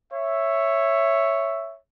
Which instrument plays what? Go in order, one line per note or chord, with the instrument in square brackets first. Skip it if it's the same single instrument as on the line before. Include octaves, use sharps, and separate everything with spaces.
[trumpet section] C#5 E5